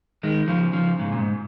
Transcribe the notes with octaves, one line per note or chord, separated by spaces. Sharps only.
D#3 G#3
C#3 F3
C#3 F3
G#2 C#3
A#2
G#2